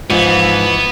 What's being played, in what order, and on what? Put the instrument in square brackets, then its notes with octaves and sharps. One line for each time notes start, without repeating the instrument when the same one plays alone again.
[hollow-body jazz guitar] G#2 [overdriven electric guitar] E3 [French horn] F3 [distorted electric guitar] B3